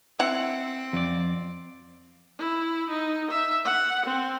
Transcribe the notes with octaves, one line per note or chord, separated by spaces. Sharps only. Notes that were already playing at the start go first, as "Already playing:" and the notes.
C4 E4 F#5
F2 D5
E4
D#4
E5
F#5
C4